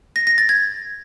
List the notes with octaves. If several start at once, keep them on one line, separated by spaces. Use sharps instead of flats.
A#6
A#6
A6
G#6